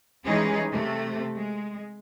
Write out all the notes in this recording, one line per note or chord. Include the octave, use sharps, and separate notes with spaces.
E3 G3 G#3 C#4 D#4 G#4
C3 A3
G#3